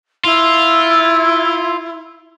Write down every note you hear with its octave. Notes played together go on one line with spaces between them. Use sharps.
E4 F4